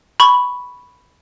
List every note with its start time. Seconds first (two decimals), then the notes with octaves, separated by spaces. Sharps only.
0.20 B5 C#6